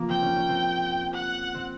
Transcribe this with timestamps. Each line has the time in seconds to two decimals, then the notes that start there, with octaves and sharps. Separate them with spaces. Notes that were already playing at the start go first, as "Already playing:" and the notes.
Already playing: F3 A#3
0.09 C4 G5
0.22 C#4
0.36 C#4
0.49 C4
1.14 F#5
1.54 C4